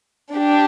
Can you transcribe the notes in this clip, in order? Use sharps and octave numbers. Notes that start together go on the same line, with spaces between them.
D4 G4